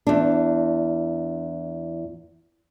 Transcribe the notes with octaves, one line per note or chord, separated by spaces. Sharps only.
E2 D4